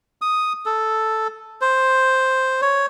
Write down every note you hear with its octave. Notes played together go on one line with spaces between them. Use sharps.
D#6
A4
C5
C#5